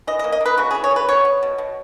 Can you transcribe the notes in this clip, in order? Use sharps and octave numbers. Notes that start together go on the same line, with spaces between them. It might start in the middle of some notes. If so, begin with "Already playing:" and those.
E3 D#5
D#5
A#3
D#5
A#3 B4
C#3 F#4
E3 G#4
C#5
C#3
B4
B3 C#5
B3
B2
B2